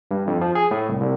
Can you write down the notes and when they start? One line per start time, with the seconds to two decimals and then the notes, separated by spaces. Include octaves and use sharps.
0.11 G2
0.27 F2
0.41 F3
0.55 G#4
0.71 A2
0.89 C2
1.01 C2